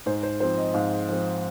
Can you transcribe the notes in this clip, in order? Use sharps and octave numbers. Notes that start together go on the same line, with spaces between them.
G#2 C5
C5
F3 C4 C5
D#5
G#2 F5
F3 C4